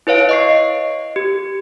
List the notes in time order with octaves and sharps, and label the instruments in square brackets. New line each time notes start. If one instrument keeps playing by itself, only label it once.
[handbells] E4 B4 C#5 F5 D7
D#5 C#6 C7
G4